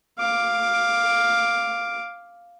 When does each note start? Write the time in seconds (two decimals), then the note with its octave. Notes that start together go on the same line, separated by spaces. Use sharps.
0.18 F5 D6